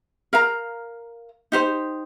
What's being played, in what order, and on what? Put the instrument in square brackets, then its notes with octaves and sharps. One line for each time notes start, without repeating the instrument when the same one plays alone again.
[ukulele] A#4 F5 A#5
D#4 G4 C5